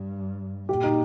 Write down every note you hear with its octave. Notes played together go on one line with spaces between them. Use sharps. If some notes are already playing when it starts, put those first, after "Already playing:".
Already playing: G2
A#2 G4
D#4